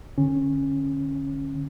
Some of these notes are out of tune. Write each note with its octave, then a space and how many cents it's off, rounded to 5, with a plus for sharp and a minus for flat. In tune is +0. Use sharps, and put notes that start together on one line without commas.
D3 +0 C#4 -15